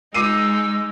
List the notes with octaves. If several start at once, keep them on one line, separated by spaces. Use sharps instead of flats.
G#3 D#4 D6 E6 C7 D#7